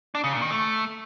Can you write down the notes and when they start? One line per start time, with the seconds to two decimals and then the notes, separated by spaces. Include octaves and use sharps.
0.15 D4
0.24 C#3
0.33 A#2
0.42 D#3
0.51 A3